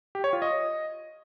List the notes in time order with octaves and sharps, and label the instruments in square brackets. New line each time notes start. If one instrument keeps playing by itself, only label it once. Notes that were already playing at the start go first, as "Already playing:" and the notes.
[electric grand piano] G4
C#5
F4
D#5